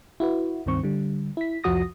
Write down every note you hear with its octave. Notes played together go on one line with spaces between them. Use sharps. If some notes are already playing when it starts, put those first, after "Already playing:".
E4 F#4 B4
C#2 G2 D#3 C4 C#6
D3 G3
E4 B6
C2 F2 F3 F#4 D#6 A#6